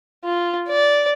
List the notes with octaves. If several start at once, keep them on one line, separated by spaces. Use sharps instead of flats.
F4
D5